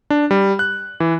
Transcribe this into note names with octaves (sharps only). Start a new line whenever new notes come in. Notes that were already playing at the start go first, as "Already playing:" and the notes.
D4
G3
F#6
E3